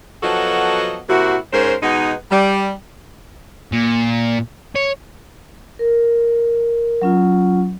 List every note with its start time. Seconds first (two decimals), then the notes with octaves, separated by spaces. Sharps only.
0.23 F3 F#3 B3 F#4 A4 D#5
1.09 C3 A#3 E4 F#4
1.53 G#2 C#4 A#4 C5
1.83 B2 G#3 B3 D#4
2.31 G3
3.72 A#2
4.76 C#5
5.79 A#4
7.02 F#3 C#4 F4